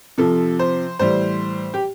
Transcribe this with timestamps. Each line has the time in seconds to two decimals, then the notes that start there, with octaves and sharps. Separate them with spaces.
0.18 C3 F3 A4
0.59 C5
0.99 A2 E3 G3 C5
1.74 G4